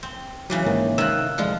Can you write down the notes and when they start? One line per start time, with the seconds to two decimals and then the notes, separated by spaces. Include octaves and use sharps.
0.03 C4
0.50 C#3 E3 F#3 G3
0.66 G#2 D#3 A#3
0.98 C3 D#3 F4 E6 F#6
1.38 D2 F3 G#3 F4 A#5